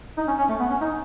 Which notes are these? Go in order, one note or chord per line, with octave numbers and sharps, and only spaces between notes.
D#4
C#4
C#4
A3
B3
C#4
D#4